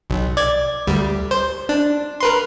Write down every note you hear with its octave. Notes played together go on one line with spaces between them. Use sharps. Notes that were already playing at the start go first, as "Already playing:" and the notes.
B1
D5 G#6
D2 G3
C5
D4
A#4 B4 C6